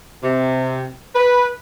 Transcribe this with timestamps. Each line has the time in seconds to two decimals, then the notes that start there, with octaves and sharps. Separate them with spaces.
0.23 C3
1.15 B4